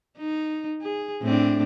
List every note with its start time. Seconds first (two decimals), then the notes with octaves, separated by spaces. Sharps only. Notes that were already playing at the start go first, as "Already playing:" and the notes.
0.17 D#4
0.81 G#4
1.22 A2 C4 D4